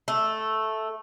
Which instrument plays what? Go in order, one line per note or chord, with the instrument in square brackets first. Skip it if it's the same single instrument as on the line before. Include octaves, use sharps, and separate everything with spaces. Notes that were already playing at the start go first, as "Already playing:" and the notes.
[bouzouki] A3